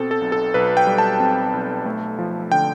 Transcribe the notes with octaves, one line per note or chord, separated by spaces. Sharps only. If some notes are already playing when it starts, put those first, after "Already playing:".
Already playing: B2 C4 A4
A4
B1
A4
B1 B4
G5
G3
A5
C4
B1
A3
F3
D3 G5